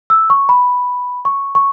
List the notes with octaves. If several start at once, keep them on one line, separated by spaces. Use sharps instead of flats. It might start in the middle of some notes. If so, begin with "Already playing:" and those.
E6
C#6
B5
C#6
C#6